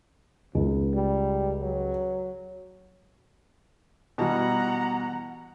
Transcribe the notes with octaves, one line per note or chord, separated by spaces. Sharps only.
G#1 C#2
G3
F#3
B2 E3 G3 F#5 A#5